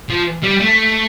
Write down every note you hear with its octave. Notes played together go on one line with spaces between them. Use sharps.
F3
G3
A3